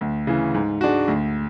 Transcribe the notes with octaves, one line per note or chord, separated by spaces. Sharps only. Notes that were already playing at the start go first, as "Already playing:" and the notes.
D2
C#3 E3
G#2
G#3 D4 F#4
D2